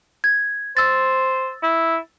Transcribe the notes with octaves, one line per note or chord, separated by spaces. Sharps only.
G#6
C5 E6 A6
E4